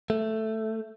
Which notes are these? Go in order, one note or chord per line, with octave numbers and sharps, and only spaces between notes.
A3